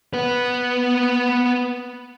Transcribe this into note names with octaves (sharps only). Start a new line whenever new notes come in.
B3 B4